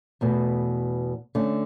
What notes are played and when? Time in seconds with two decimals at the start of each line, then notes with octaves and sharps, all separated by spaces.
0.21 E2 B2 A3
1.35 D3 A3 C#4